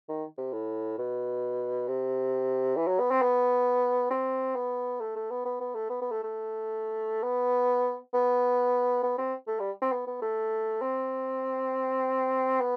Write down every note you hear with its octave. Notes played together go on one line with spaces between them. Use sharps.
D#3
C3
A2
B2
C3
E3
F#3
B3
C4
B3
C4
B3
A3
A3
B3
B3
B3
A3
B3
B3
A3
A3
B3
B3
B3
C4
A3
G3
C4
B3
B3
A3
C4
B3